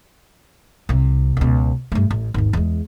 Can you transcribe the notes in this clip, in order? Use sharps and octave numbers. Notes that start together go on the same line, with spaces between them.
C2 C3
C#2 B2
G2 A3
A1
G#1 D#2
E2 G#3